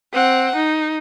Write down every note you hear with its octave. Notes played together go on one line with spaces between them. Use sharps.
C4 F#5
D#4